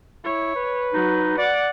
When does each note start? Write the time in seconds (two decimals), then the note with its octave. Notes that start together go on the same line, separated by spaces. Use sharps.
0.24 E4 C#5
0.56 B4
0.93 F#3 D#4
1.38 D5 F#5 D6